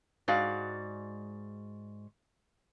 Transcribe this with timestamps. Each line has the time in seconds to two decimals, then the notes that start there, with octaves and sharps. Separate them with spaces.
0.28 G#2 G#3 F#4 D5 F5